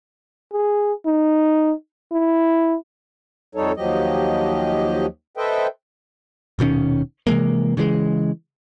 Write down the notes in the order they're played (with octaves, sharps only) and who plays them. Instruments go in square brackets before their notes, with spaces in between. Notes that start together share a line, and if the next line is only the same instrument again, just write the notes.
[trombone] G#4
D#4
E4
[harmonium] F2 G3 D#4 A4 C#5
D#2 F3 F#3 G4 D#5
A4 B4 C5 D#5 E5 G5
[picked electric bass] D#1 B2 D#3 C#4
C3 E3 G#3 A#3
C#3 E3 F#3 G#3